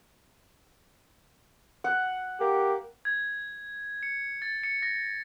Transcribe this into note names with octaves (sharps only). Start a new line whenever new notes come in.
F#5
A#3 G4
G#6
C#7
A6
C#7
A#6